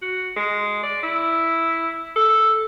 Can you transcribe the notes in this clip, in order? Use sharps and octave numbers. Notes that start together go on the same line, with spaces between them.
F#4
G#3
D5
E4
A4